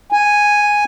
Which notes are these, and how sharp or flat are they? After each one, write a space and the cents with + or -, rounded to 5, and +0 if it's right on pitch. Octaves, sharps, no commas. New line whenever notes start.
G#5 -5